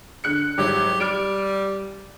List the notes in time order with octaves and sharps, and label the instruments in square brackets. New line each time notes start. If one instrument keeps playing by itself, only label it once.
[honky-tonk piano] D3 F#6 C#7
[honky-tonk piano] G#1 F#3 G3 [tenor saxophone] G4
[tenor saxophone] G3 [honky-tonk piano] F6 D7